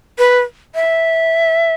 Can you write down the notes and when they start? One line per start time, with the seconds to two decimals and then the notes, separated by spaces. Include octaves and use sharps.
0.19 B4
0.75 E5